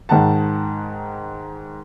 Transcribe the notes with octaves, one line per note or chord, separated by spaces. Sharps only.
G#2 D#3 F#5 A5